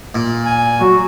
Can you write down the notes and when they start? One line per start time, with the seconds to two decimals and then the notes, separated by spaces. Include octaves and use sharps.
0.15 A#2
0.45 G#5
0.80 F#3 F#4